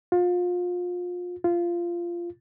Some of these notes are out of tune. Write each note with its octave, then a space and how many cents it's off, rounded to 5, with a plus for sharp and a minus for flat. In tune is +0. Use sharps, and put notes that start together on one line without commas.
F4 +30
F4 -15